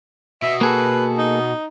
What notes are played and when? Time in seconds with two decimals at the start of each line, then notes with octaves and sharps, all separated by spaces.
0.42 B2 E5
0.61 A#3 G#4 A4 B4
1.18 D#4